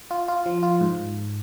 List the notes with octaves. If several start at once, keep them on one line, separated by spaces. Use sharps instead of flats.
F4
F4
F3
F4
G#2